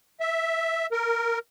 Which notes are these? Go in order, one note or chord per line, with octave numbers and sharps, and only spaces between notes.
E5
A#4